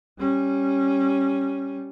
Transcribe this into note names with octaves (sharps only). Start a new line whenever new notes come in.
G3 C#4